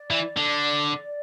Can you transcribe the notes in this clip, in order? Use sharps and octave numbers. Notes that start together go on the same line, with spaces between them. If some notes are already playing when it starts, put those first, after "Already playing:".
Already playing: D5
E3
D3